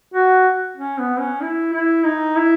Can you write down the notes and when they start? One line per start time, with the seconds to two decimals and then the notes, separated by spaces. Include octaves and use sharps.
0.14 F#4
0.77 C#4
0.98 B3
1.19 C#4
1.41 E4
1.73 E4
2.04 D#4
2.36 E4